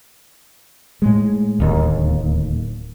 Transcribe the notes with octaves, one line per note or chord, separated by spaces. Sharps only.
A2 G#3
D1 D#2